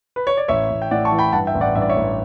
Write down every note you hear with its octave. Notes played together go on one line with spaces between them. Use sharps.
B4
C#5
D5
A1 C#5 E5
A1
G5
A2 D5 F#5
A5 C#6
E3
G5 B5
G2 F#5 A5
E5 G5
A1
D5 F#5
G2 E5
D5
C#5 E5
A1